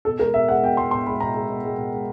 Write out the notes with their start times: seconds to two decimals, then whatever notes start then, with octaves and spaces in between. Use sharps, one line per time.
0.05 B2 A4
0.19 G#3 A#4
0.34 B2 E5
0.48 G#3 F#5
0.63 B2 G5
0.77 G#3 C6
0.91 B2 C6
1.07 G#3 B5
1.20 B2 A#5
1.35 G#3
1.49 B2
1.64 G#3
1.78 B2
1.93 G#3